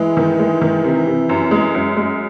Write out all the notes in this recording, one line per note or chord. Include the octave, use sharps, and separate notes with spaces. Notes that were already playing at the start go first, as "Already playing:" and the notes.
Already playing: E3 G#3
D#3
G#3
D#3
C3
C3
F#2
G#3
F#2
G#3